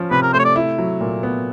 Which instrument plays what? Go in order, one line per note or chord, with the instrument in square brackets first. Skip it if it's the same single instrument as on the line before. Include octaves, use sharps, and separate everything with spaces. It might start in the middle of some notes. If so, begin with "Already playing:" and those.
Already playing: [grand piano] F3 C#4
[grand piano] C3 [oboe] B4
[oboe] A#4
[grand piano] A3 [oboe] C5
[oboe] C#5
D5
[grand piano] E4
F#3
A#2
B3